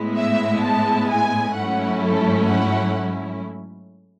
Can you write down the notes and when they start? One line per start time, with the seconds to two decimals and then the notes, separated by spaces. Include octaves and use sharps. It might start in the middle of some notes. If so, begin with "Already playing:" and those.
Already playing: A2 G#3 B3 E4
0.19 E5
0.65 A5
1.11 G#5
1.56 G#2 F#3 A3 C#4 E4 F#5
2.02 A4
2.48 F#5